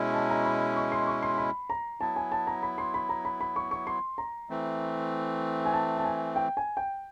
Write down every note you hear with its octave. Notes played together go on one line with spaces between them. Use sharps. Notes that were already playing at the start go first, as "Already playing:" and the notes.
Already playing: B2 G#3 C#4 E4
A5
A#5
B5
C#6
C6
C#6
C6
B5
A#5
F#3 B3 E4 A5
G#5
A5
A#5
B5
C6
B5
A#5
B5
B5
C#6
C#6
C6
A#5
E3 A3 C4
G#5
A5
A5
G#5
G5
G#5
G5